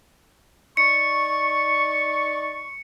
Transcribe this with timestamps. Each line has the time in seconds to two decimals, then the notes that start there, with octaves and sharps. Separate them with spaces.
0.77 D#4 D5 C#6 C#7